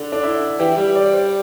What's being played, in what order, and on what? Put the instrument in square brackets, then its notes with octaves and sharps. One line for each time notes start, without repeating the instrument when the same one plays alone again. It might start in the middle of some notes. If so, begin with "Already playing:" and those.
Already playing: [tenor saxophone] D3 [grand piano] D4
[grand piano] D4
E4
[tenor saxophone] E3 [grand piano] G4
[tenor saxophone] G3 [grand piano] G4
[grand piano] D5
C5